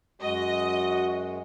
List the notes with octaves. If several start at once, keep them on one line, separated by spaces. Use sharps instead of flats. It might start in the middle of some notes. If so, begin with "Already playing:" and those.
F#2 G#3 F#4 D#5